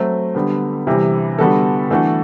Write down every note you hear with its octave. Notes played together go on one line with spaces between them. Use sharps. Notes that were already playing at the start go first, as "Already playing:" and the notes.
Already playing: F#3 A3 C4
D3 G3 B3
C3 E3 G3
D3 G3 B3 F#4 A4
E3 A3 D4 F#4 A4